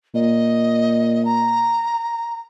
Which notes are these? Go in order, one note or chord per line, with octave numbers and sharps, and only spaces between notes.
A#2 D#5
A#5